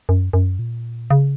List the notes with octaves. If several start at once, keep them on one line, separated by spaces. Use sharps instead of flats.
F#2
F#2
A#2
C#3